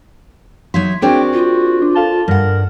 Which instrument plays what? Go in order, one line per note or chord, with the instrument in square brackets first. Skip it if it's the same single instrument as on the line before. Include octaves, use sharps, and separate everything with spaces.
[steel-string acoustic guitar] F#3 D#4 E5 [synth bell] C6 G#6
[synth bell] C4 D4 G#4 [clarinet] F#4 [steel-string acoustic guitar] A#4 C5 D5 [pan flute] G5
[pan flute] F4
[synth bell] D4
[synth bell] A4 F5 G7 [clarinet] A5
[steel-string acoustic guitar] G2 F#5 [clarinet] A#4